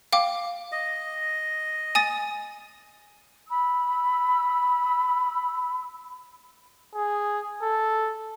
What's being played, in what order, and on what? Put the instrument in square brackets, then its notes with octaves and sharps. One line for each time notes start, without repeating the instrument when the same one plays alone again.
[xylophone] F5 G5 D6
[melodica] D#5
[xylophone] G#5 D#6 A6
[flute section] B5 E6
[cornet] G#4
A4